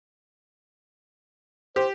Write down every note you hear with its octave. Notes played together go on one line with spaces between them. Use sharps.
G4 C5